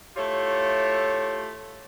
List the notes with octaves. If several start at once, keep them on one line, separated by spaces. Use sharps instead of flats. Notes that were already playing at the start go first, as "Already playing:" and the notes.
A3 E4 F4 G4 C#5